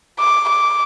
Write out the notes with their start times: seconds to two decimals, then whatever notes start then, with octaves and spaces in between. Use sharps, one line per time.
0.19 D6
0.49 D6